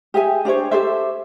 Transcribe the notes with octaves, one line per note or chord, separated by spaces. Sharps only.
G4 G#4 E5 G#5
D4 G4 C5 C#5
G4 A4 C5 E5